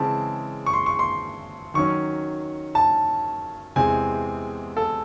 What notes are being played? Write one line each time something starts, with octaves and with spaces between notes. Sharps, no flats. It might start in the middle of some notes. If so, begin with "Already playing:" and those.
Already playing: C#3 E3 G#3 C4 A5
C#6
C6
C#6
C6
D#3 F#3 C#4 C#6
A5
E2 C3 E3 G#3 C4 G#5
A4